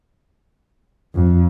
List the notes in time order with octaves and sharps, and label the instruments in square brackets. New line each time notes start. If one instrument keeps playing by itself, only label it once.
[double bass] F2